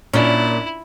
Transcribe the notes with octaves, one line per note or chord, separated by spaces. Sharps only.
A#2 C#4 D4 E4